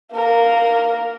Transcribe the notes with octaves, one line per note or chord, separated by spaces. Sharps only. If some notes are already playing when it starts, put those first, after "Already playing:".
A#3 A#4